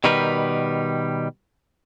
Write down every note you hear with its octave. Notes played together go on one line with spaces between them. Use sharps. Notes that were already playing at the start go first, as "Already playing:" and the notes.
B2 D#3 G3 A#4 B4